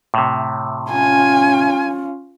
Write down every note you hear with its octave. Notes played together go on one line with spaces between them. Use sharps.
A2 C3
C#4 F4 G#5